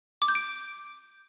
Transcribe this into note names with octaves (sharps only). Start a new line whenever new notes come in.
D6
G6
D7